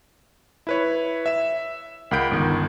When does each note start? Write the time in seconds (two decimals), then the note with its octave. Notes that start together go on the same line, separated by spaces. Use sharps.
0.67 E4 B4 C#5
1.26 E5 E7
2.11 C#2 A#4 F#5 B5 G6 D7
2.31 G1 D#3